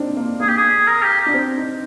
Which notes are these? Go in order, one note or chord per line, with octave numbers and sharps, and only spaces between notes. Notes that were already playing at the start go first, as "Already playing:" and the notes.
Already playing: A#3 C4 D4 D#4
A#3
A#3 G#4
G4
G#4
A#4
G4
D4
C4
D#4